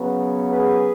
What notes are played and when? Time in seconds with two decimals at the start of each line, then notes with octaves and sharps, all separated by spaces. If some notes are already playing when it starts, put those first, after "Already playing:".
Already playing: C#3 F#3 B3
0.52 G#4 B4